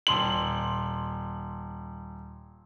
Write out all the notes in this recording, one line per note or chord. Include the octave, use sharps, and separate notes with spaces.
D#1 C6 F#7